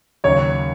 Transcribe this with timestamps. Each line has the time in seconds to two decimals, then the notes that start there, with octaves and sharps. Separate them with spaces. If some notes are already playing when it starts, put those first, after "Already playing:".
0.24 D#2 C#3 F#3 C#5